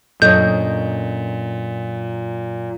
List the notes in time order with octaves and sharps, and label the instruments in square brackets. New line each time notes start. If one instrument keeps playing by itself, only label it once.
[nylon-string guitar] F#2 D4 C#5 [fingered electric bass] A#2 [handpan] C#4 A4 D#5 [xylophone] G6